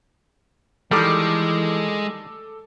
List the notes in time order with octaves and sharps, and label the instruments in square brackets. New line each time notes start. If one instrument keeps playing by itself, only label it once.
[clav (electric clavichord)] D#3 G3 [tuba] E3 [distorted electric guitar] G#3 [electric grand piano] A4 D6